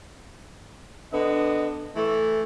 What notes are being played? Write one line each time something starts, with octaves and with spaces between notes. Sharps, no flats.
D3 B3 D#5
E3 A3